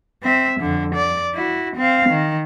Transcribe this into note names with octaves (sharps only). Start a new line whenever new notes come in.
C4 E5
F2 D3
D5
E4 F#4
C4 F5
D#3